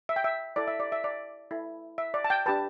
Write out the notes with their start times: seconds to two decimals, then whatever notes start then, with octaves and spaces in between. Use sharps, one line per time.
0.09 E5
0.16 G5
0.24 E5
0.56 E4 A4 D5
0.68 E5
0.80 D5
0.92 E5
1.04 D5
1.51 E4 A4
1.98 E5
2.14 D5
2.24 A5
2.30 G5
2.46 D4 G4 B4 A5